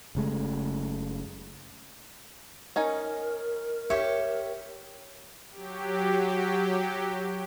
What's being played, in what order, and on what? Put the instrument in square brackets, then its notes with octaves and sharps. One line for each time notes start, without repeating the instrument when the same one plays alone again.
[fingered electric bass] F#1 C#3 G#3 A3
[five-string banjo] C#4 D#4 G#5 [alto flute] A#4
[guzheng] G4 C#5 [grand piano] E5
[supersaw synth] F#3 G4